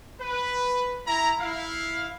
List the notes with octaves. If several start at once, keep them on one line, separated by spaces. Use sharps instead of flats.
B4
E4 A#5
E4 F5